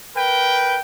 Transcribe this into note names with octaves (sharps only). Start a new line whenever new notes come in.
A#4 B4 G5